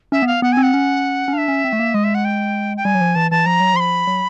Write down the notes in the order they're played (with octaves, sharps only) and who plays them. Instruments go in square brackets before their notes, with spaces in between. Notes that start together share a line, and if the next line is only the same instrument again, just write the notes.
[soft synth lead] C#4 [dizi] E5
[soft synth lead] B3
[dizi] F5
[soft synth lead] B3 [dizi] F#5
[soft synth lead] C4 [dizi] G#5
[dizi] F#5
[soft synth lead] C#4
C#4
[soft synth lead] D4 [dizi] F5
[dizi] E5
[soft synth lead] C#4
C4
A3
A#3
[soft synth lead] G#3 [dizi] D#5
[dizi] E5
F#5
G5
G5
[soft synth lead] G3 [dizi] G#5
[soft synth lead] F#3
F3
[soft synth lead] E3 [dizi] A5
[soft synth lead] E3 [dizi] A5
[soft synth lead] F3 [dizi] A#5
[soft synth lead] F#3
[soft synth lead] F3 [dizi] C6
[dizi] B5
[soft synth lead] F#3